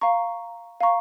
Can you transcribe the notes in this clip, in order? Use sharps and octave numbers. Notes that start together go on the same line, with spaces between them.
F5 A#5 C#6
F5 A#5 C#6